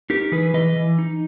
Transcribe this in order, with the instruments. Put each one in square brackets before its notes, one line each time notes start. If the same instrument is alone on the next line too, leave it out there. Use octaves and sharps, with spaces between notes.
[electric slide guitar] D#4 G4 A#4
E3 G#4 B4
E3 B4 D#5
E3
D#4